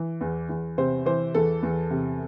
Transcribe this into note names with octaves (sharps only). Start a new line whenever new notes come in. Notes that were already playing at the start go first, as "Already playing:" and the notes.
Already playing: E3
E2
E2
C3 C5
E3 C5
E2 A4
E2
C3